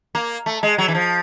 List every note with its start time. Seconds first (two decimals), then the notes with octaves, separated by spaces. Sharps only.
0.15 A#3
0.46 A3
0.63 G#3
0.78 F#3
0.88 E3
0.95 F3